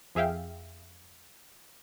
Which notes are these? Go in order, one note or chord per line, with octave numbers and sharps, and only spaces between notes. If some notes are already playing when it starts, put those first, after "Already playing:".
F2 G#4 E5 F5 G5